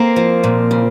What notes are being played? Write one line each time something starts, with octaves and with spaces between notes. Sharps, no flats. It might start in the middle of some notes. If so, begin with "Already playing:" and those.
Already playing: A#3 C4
F3
A#2
C#3